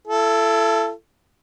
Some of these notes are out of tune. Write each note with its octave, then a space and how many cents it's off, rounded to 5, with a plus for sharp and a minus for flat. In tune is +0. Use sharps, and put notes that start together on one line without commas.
E4 +35 A4 +0